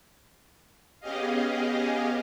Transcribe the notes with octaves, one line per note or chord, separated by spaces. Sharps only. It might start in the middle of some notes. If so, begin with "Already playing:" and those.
B3 C#4 G4 G#4 D#5 F5